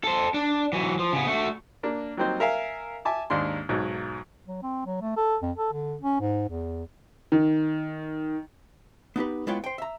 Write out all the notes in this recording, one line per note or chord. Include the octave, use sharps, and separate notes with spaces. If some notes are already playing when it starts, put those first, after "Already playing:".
A4 C5
D4
E3 F#3
F3
C#3 B3
A3 F#4
A#3 D4
F#3 G3 A#3 C4 D#4 C5
A#4 E5 F5 G#5
E5 G#5 A5 D6
D#2 G#2 D4 C6
B1 G#2 F#3
F#3
C4
F#3
A3
A4
F2
A4
D3
C#4
G#2
E2
D#3
B3 D#4 G4 B4
G#3 B3 E4 F4 C#5 G5
C5 G5
E5 A#5